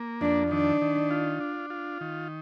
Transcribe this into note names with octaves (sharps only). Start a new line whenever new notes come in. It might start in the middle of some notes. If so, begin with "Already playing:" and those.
Already playing: A#3
F2 D4
D#3 D4
D#3
F4
D4
F4
D#3